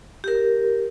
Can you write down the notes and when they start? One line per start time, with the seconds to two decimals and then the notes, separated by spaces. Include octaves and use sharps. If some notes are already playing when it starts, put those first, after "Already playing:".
0.24 G4 A#4